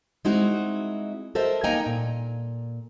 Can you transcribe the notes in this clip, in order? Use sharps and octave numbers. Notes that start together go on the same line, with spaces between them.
G#3 C4 D#4 E4 F#4
A4 A#4 C5 D#5 E5
A#3 D#4 D#5 G5 G#5 A#5
A#2